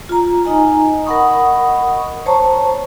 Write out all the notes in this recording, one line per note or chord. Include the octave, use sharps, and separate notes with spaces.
F4 A#5
D#4 D#5 G#5 A#5
A#4 D#5 F#5 B5 C#6 D#6
C5 C#5 A5 A#5 C#6